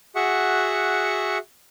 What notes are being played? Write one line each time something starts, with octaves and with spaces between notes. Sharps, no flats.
F#4 G#4 E5 F#5 C#6